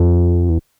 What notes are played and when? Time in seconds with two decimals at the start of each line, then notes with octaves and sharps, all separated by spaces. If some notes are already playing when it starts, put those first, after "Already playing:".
Already playing: F2
0.49 E2